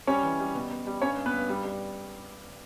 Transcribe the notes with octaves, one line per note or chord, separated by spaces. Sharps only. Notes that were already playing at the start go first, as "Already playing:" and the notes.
G3 C#4 C#5
E3
G3
B2
B2
G3
G2 C#4 C#5
G2
B3 B4
G2
G3
G3